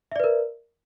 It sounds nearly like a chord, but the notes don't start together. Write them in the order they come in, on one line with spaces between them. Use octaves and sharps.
E5 D5 B4 A#4